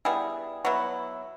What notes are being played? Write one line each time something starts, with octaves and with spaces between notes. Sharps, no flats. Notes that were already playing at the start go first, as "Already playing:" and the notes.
G3 B3 E4 G#4
F#3 B3 E4